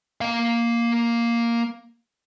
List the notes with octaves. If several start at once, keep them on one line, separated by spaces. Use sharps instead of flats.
A#3 F5